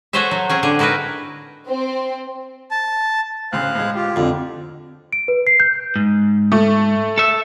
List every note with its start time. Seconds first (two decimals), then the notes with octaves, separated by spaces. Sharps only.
0.13 F#4 G#4 A4 C5 C#5 E5
0.31 F#3
0.50 C4 C#4 G#4
0.63 D3 G#4
0.79 D#4 E4 F#4 A#4 B4
1.67 C4
2.71 A5
3.52 D2 A2 C#3 C5 F5 F#6
3.75 A2 G#3
3.95 F4 G4
4.16 F2 D3
5.13 D7
5.28 B4
5.47 C7
5.60 G6
5.96 G#2
6.52 A3
7.18 A4 E5